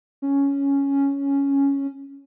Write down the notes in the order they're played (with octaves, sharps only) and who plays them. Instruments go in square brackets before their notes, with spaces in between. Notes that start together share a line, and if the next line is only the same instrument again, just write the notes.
[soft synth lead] C#4